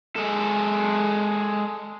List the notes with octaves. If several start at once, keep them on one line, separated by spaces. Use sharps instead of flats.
G#3 A4